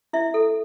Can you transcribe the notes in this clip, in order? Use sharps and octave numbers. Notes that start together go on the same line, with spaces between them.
E4 E5
A4